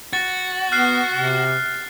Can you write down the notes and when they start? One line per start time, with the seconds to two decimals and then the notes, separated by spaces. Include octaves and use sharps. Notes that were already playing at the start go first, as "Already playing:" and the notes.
0.13 F#4 A6
0.72 B3 F6 F#6 C7
1.13 C3